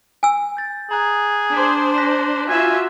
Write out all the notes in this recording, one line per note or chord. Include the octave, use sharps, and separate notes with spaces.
G#5 E6
G6 A6
G#4 A#5 F#6
D4 C5 C6 D6 B6
F#6 A#6 B6
F4 F#4 E5 G#5 F#6 B6 E7